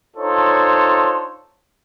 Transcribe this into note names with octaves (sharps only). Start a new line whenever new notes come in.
D4 D#4 F4 A4 C5 C#5